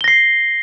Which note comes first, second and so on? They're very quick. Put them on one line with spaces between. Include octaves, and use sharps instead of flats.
G7 A#6 C7